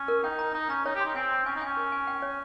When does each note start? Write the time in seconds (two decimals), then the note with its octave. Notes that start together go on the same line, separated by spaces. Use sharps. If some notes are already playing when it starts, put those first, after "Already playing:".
Already playing: C#4
0.08 A#4
0.24 D#4 G5
0.39 A#5
0.54 D#4 A#5
0.69 C#4 A#5
0.85 D#4 C#5
0.95 G4
1.00 C6
1.06 D#4
1.15 C4 G#5
1.31 C6
1.46 C#4 G#5
1.56 D#4
1.61 C#4 G#5
1.77 A#4
1.92 G#5
2.07 G5
2.22 C#5